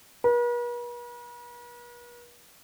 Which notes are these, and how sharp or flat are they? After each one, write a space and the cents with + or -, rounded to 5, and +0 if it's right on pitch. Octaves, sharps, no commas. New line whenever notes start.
B4 -45